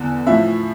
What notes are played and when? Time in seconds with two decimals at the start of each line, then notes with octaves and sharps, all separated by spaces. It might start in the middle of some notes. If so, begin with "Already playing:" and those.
Already playing: E2 D3
0.27 A2 F3 E5